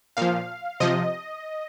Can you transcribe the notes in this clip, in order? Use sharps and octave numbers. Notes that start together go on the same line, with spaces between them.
A#2 F3 F5
C3 F3 D#5